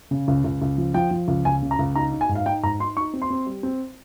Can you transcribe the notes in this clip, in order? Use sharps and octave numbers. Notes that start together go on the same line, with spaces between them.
C#3
C#2
C#2
C#2
F3
F3 G5
F3
C#2
C#2 G#5
C#3
A#5
C#2
D#4 A#5
D#4
G#5
G#2
F5
D#4 G5
G#2 A#5
D#4 C6
D#4 C#6
C4
C6
C4
G3
C4